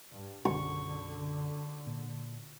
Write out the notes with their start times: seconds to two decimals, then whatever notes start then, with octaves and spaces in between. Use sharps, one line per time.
0.10 G2
0.45 B1 F#2 D3 C#6
1.87 A#2